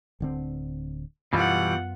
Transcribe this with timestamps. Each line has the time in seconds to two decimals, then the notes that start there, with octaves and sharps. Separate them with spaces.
0.20 D1 D3 C4
1.33 F#2 B2 E3 G3 B3 F4 F#5